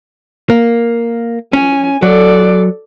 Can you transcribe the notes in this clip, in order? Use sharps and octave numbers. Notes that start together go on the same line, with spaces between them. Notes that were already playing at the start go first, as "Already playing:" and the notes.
A#3
C#4 G#5
F#3 A4 D5